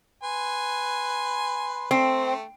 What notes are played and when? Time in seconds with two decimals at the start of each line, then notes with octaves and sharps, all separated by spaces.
0.24 B4 G#5 C6
1.91 A3 C4